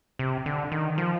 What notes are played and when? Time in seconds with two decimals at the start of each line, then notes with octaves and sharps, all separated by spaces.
0.19 C3
0.46 D3
0.72 D#3
0.98 F3